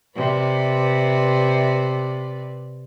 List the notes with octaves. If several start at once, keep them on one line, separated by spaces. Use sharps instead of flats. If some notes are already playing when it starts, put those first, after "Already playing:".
C3 B4 D5